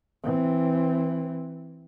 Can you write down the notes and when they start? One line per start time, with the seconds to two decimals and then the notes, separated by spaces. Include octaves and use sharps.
0.23 E3 C4